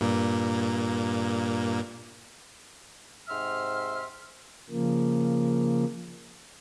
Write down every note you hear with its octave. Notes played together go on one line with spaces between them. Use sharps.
G2 A#2 A#3
G#2 C3 E5 C6 F6
C#3 F3 A#3